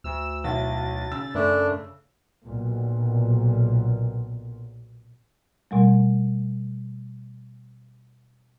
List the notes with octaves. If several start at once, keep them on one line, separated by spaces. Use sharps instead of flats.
D2 E6
B1 E4 A6
C#3 E6
F#2 A3 D4
B1 A#2
B2 G3 A3